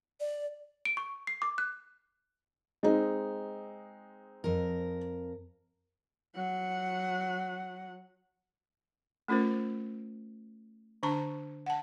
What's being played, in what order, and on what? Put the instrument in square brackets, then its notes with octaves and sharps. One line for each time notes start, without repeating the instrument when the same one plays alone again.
[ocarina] D5
[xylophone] D7
C#6
C7
D6
F#6
[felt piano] G#3 C4 D#4
[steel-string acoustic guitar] F2 A#4
[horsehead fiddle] F#3 F#5
[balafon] A3 C#4 F4 A#4 C5
D3 D4 A5 A#5 C#6
F#5 A5